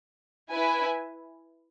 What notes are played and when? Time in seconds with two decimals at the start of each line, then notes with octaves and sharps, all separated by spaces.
0.51 E4 B4 E5 G#5